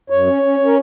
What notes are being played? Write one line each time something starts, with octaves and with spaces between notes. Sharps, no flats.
F#2 C#5
C#4
C#4
C#4
A#4